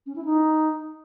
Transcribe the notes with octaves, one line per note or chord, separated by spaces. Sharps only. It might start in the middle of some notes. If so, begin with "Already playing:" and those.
C#4
E4
D#4